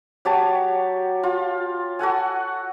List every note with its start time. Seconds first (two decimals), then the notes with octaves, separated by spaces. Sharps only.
0.25 F#3 G4 C#5 A5
1.23 F4
1.99 F#4 A4 F#5 G#5